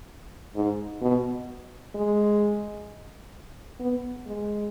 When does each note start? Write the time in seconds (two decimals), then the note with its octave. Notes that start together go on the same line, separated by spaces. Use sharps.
0.55 G#2
1.02 B2
1.95 G#3
3.80 B3
4.27 G#3